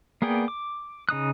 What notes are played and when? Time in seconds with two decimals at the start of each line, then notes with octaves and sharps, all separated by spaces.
0.22 A#3 B3 G#4 D5 G5
0.48 D6
1.09 C#3 D#4 D#6 F#6